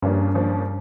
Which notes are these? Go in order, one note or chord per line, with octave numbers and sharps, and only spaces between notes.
G2 C#3 F3 A#3 D4
C#3 F3 A#3 D4